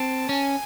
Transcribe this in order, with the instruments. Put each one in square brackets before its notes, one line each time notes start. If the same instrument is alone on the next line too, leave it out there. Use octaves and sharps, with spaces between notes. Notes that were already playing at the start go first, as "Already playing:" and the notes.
Already playing: [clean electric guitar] C4 [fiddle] A5
[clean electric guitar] C#4 [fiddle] G#5